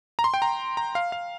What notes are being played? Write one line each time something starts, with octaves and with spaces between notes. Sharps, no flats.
A#5
C6
G5
A#5
A#5
F5
F5